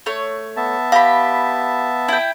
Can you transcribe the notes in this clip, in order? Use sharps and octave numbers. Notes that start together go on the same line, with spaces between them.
A3 C#5
B3 E5 A5
G4 F5 B5
E4 G5